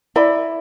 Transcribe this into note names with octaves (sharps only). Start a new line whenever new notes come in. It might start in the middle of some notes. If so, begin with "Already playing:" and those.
E4 D5 B5